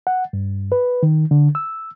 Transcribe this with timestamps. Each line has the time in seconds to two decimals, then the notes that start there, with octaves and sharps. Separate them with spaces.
0.07 F#5
0.33 G2
0.72 B4
1.03 D#3
1.31 D3
1.55 E6